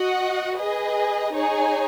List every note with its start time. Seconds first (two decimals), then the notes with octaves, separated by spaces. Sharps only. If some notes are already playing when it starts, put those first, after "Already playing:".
Already playing: F#4 D#5 F#5
0.57 G#4 B4 D#5
1.33 D#4 G#4 C#5 G#5